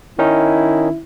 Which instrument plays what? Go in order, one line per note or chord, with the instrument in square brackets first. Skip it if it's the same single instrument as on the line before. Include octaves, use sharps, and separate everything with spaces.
[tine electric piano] D#3 C#4 D#4 [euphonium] E4